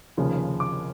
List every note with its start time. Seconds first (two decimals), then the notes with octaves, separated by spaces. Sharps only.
0.17 F1 D#2 C#3 F3
0.60 D6